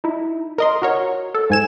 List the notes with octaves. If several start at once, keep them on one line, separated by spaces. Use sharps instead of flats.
D#4 E4
A#4 D#5 C6
F#4 A#4 C#5
A4
G#2 G#5 E7